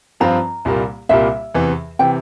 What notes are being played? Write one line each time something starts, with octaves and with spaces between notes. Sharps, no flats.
G2 F3 C4 F4 A#5
C2 A#2 G3 A#3
C2 A#2 G3 A#3 E5
E2 C3 E3
C3 E3 G5